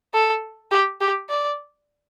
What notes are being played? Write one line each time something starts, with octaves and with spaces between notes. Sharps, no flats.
A4
G4
G4
D5